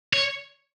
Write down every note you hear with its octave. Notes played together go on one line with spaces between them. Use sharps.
C#5